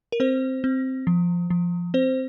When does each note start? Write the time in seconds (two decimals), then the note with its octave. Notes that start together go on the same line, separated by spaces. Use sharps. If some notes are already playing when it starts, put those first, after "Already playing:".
0.12 A#4
0.20 C4 C5
0.64 C4
1.07 F3
1.50 F3
1.94 C4 C5